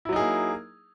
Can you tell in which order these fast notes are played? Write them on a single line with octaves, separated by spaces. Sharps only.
E4 F#3 D#4 G#4 A#3